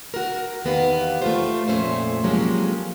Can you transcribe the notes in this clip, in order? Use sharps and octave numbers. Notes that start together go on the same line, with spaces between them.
F#4 A#4
E2 D#3 B3 G4 F5
A3 F4 C5
F2 A#2 D3 A3 C#4 C5
C3 F3 F#3 G#3 A#3 C#4